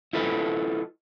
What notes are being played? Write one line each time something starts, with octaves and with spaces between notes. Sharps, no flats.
E4 F4 A4 B4 D#5